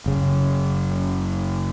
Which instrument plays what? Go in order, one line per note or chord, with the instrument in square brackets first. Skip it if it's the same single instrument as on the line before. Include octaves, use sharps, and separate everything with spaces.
[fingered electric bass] F#1 C#3